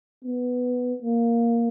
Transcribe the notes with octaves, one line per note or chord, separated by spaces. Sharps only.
B3
A#3